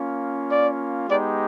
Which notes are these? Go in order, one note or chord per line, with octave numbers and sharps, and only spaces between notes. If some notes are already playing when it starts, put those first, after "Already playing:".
Already playing: A#3 C#4 F4
D5
G#3 B3 D#4 G4 D5